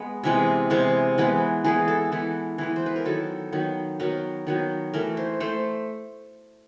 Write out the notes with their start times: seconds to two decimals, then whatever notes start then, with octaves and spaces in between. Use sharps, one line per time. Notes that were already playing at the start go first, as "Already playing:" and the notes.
Already playing: G#3 B3
0.24 C3 E3 G#3 B3
0.70 C3 E3 G#3 B3 C5
1.18 E3 G#3 B3
1.64 E3 G#3 B3 G#4
1.88 A4
2.12 E3 G#3 B3
2.58 E3 G#3 B3
2.76 C5
2.86 B4
2.96 A#4
3.05 D#3 F#3 B3 A4
3.52 D#3 F#3 B3
4.00 D#3 F#3 B3 A#4
4.47 D#3 F#3 B3
4.93 E3 A3 A#4
5.17 C5
5.40 A3 C5